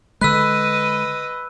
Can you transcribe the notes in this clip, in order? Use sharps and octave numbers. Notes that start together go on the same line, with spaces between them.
D3 G#3 B4 D#5 B5 E6 F#6 B6